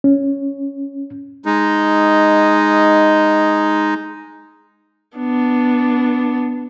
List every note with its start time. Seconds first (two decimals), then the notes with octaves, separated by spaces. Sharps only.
0.04 C#4
1.46 G#3 D#4
5.17 B3 D4